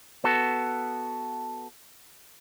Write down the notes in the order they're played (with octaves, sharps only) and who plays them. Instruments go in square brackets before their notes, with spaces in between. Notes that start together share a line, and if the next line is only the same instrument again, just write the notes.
[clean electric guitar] B3 F#4 A4